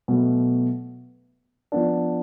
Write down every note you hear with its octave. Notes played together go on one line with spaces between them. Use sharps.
B2 F#3 A3
F3 B3 D4